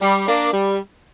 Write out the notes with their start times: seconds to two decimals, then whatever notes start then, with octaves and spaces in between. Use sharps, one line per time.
0.02 G3
0.28 A#3 D4
0.53 G3